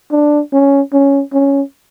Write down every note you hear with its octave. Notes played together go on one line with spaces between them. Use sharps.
D4
C#4
C#4
C#4